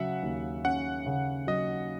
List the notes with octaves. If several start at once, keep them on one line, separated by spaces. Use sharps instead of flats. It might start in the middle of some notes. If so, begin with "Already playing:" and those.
Already playing: C#3 F#3 E5 F#5
D#2
C#4 F#5
C#3
F#3 D#5